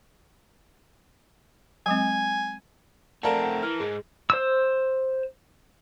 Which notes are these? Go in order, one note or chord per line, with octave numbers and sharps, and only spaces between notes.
F#3 G#3 C4 G#5
A3 C4 A#4 D5 F5 F#5 A5
F#5
E3 F6
G#2 G#3 G#4
C5 E6